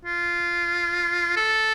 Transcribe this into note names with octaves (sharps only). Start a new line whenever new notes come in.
F4
A4